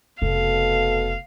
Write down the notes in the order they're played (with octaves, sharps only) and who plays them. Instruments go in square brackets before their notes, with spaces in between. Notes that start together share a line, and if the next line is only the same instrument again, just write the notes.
[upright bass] F1 [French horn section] B2 A4 [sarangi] F5